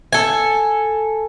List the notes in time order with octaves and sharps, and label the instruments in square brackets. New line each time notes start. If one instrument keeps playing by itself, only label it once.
[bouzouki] A4 G#5